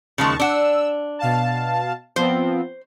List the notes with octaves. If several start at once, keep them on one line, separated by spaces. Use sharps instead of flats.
D#2 C#3 F3 G#3 A5 C#6
D4 F#5 E6
B2 F5 A5
F3 B3 C4 C5